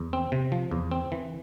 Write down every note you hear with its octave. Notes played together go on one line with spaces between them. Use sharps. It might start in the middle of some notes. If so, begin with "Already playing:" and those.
Already playing: E2
C4
C3
F3
E2
C4
E3